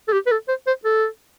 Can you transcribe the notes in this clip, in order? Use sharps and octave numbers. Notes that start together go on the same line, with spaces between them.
A4
G4
B4
A4
C5
C5
A4